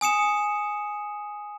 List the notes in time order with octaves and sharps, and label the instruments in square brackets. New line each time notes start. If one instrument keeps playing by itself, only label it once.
[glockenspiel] G#5 D#6 C#7 E7